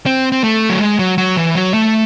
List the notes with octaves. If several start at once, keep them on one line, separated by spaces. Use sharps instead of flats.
C4
C4
A3
F#3
G#3
F#3
F#3
E3
F#3
A3